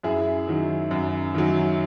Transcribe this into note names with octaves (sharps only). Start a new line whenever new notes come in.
F#2 E4 G#4
D#3 F#3
F#2
D#3 F#3